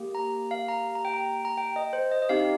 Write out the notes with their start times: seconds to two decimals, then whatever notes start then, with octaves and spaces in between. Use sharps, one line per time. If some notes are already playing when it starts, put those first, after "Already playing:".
Already playing: A#3 G4
0.15 A#5
0.51 F5
0.68 A#5
0.95 A#5
1.05 G5
1.14 A#5
1.45 A#5
1.58 G5
1.76 D#5
1.93 C5
2.11 D#5
2.22 D#5
2.29 C4 D#4 G4 F5